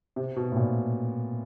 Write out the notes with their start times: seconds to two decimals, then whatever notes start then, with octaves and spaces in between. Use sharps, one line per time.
0.16 C3
0.36 B2
0.52 A2
0.56 A#2